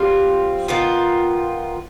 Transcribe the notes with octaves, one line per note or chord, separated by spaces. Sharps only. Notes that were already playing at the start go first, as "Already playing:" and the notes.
Already playing: G3 C4 F4
D#3 B3 F4